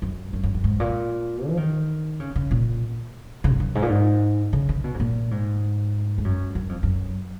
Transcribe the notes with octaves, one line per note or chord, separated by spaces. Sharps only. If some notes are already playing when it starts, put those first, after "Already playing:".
F#2
F#2
F#2
F#2
G#2
A#2
F3
D#3
C#3
C#3
A#2
C#3
F2
F#2
G#2
A#2
G#2
C#3
D#3
B2
G#2
A#2
G#2
G#2
F#2
F#2
F2
F#2